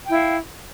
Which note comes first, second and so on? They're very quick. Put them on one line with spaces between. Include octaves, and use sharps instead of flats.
G5 E4 F5